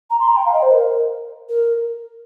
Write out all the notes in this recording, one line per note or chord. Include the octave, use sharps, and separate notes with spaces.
A#5
C6
A#5
G5
F5
D#5
C5
A#4
A#4